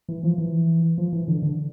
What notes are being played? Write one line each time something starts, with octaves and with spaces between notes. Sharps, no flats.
E3
F3
E3
F3
E3
D3
D3